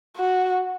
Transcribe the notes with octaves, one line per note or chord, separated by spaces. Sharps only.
F#4